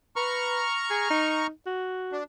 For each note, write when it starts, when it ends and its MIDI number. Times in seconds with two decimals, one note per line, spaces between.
0.16 0.62 71
0.16 1.47 82
0.16 1.47 85
0.16 1.47 89
0.90 1.07 68
1.10 1.49 63
1.66 2.18 66
2.12 2.24 62